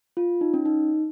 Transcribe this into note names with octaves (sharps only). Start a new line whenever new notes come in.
F4
D#4
C#4
D#4